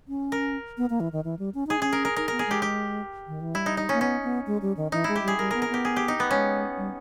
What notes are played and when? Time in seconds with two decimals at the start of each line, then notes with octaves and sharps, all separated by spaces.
0.08 C#4
0.32 A#4
0.78 B3
0.90 A#3
1.00 E3
1.13 D#3
1.24 E3
1.39 G3
1.54 C#4
1.67 D#4 G#4
1.80 C#4 G#4
1.92 A#4
2.05 A#4
2.16 D#4 A#4
2.28 B3 A#4
2.39 G#4
2.47 G#3 G4
2.62 G4
3.28 D#3
3.41 E3
3.55 G3 E4
3.66 D#4
3.77 D#4
3.89 A#3 C#4
4.01 B3 C#4
4.23 B3
4.47 G#3
4.62 G3
4.77 D#3
4.92 E3 D#4
5.04 G#3 E4
5.15 G4
5.23 G3 G#4
5.39 G3 A#4
5.51 B3 A#4
5.62 A#4
5.69 B3 G4
5.85 G#4
5.96 G4
6.08 D#4
6.20 B3
6.31 G#3 C#4
6.77 G3